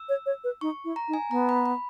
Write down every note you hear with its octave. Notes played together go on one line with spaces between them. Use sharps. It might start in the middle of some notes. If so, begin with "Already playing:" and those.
Already playing: E6
C#5
C#5
B4
D#4 C#6
E4
A#5
D#4
G#5
B3 A#5
B5
B5